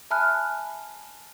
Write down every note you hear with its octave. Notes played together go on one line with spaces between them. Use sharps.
E5 G#5 A5 B5 F6 F#6